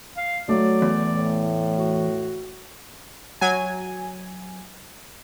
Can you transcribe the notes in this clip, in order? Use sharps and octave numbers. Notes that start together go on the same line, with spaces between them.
F5
F#3 A3 D5
E2
A2
F#4
F#3 G#5